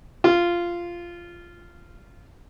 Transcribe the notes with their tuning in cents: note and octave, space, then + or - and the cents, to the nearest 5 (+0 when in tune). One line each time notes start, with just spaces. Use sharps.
F4 -10